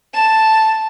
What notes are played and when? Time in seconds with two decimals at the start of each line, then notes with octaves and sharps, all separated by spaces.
0.14 A5 E7